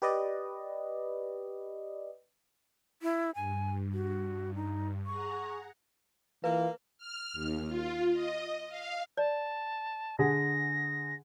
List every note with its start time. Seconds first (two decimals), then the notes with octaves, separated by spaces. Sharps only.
0.02 G4 B4 D5 D#5
3.02 E4
3.35 G2 G#5
3.93 F#4
4.55 D#4
5.06 G#4 F#5 A#5 C#6
6.44 E3 A#3 F4 B4
6.98 F6
7.33 D#2
7.67 F4
8.12 D#5
8.68 F5
9.17 D5 A5
10.19 D3 G#4 F#5 A#6